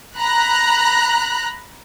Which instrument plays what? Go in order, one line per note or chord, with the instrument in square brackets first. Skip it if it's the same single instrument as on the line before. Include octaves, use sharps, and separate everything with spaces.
[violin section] A#5 B5 F#6